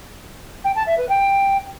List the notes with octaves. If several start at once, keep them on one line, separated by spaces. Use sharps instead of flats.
G5
A5
E5
B4
G5